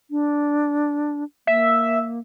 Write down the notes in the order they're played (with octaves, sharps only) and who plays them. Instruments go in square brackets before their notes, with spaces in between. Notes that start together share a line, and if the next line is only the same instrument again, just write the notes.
[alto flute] D4
[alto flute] A#3 [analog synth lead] E5